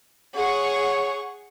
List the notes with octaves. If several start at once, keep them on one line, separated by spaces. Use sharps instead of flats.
G#4 C#5 F#5 C#6